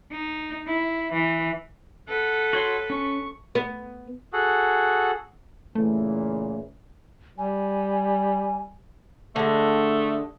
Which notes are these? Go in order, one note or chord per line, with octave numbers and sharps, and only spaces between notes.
D#4
E4
E3
A4 B4 F#5
F#4 C#5 C6
C#4 C#6
B3
F#4 G#4 A4 F#5
A#2 C#3 E3 A3
G3 G#5
D3 G#3 A3